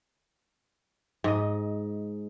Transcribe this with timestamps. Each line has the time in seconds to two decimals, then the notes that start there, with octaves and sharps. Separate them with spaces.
1.24 G#2 D#5